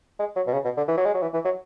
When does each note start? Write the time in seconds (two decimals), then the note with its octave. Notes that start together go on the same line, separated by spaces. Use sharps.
0.19 G#3
0.36 F#3
0.47 B2
0.53 C#3
0.64 B2
0.77 D3
0.88 E3
0.97 F#3
1.05 G#3
1.14 F#3
1.22 E3
1.34 E3
1.45 F#3